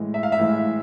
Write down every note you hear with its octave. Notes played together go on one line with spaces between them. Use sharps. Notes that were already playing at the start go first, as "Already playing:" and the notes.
Already playing: A2 E3 G#3
E5
F5
E5
A2 E3 G#3